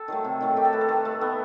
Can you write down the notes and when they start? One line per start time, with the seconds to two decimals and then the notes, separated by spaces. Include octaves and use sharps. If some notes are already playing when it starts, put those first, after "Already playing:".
Already playing: A4
0.08 D#3 F#3 A3
0.24 C3
0.41 D#3 F#3 A3
0.56 D#3 G4
0.65 A4
0.72 A3 B4
0.81 A4
0.88 D#3
1.05 A3
1.21 D#3 B3